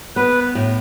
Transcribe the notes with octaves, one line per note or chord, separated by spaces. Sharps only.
B3 B4
A2